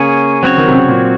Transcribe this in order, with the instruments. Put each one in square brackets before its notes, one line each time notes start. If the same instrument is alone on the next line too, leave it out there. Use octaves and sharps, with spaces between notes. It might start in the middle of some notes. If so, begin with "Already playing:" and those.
Already playing: [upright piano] C#3 [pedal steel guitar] A#3 C#4 G#4 C#5
[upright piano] C#3 [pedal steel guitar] F#3 C4 F#4 C#5
[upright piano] D#3
C3
C#3
A#2